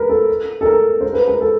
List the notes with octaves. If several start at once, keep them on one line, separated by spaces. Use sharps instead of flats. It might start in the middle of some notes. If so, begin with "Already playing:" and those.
Already playing: A#4 B4
A4
A4
A#4
C5
B4
A#4
A4